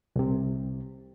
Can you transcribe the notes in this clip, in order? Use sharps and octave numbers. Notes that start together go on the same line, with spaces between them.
C2 C3